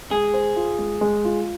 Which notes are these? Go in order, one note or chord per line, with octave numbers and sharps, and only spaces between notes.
G#3 G#4
C5
F4
G#3
G#3
F4